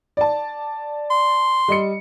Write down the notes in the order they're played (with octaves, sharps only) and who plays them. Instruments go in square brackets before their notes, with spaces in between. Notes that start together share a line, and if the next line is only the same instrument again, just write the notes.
[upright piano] D5 A5
[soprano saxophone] C6
[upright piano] G3 D#5 C#7